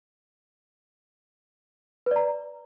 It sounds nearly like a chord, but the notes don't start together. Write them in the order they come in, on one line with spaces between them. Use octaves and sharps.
B4 D5 A#5